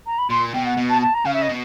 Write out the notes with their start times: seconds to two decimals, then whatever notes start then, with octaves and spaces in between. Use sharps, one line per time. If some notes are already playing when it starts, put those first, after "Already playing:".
0.06 A#5
0.18 B5
0.30 A#2 C6
0.54 B2 G5
0.65 F#5
0.77 B2
0.89 A5
1.01 A5
1.14 A#5
1.25 C#3 F5
1.33 E5
1.42 D#5
1.49 B2